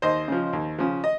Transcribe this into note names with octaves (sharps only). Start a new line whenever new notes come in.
D#2 C5 D#5
C#3 F3
D#2
C#3 F3
D#5